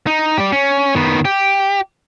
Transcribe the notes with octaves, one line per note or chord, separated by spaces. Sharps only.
D#4
G4 D5
C#4
D#3 B3
G4